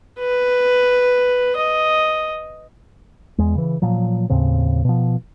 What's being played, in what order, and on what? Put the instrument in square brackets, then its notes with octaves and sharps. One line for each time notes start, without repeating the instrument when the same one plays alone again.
[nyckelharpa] B4
D#5
[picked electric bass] E2 G#3
C#3 E3
A#2 F3 F#3
D#2 A2 C#3 C4
B2 F3